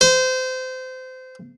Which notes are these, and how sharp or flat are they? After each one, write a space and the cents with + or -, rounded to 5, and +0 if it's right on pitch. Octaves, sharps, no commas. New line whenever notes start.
C5 -25